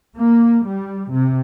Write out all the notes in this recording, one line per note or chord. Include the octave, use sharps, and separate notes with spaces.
A#3
G3
C3